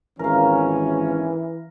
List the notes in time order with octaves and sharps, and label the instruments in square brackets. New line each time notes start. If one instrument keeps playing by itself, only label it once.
[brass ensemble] G#1 C#4 [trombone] E3 [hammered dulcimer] A#4 F5